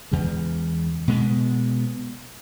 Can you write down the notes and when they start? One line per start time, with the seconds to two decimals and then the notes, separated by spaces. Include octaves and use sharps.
0.11 E2 C#3 G#3
1.08 B2 G#3 B3